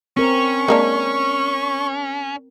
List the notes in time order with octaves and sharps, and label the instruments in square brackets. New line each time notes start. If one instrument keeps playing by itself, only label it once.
[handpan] C4 A#4 [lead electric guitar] C#4 [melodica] C#6
[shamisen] G#3 A#3 D4 [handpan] A#4